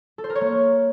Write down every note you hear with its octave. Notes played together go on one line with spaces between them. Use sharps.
A4
C5
A#4
C#5
A#3